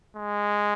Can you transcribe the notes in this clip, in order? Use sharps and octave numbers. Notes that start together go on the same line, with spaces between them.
G#3